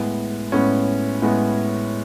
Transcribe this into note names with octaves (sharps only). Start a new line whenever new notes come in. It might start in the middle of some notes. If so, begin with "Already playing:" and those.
Already playing: A2 G#3 B3
A2 G#3 B3 C#4
A2 G#3 B3